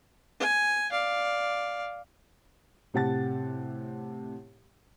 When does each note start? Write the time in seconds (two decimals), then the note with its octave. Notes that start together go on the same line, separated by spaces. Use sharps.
0.40 G#5
0.92 D5 F5
2.94 A2 C3 G4 F#5 A5 A6